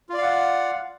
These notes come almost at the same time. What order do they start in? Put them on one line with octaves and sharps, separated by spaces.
F4 D5 F5 F#5